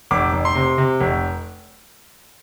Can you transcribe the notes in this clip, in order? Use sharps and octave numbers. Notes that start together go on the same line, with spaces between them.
F1 D6
F1
C6
C3
C3
F1